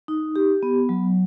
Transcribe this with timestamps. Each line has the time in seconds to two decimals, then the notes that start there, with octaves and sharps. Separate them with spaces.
0.08 D#4
0.36 G4
0.63 B3
0.89 F#3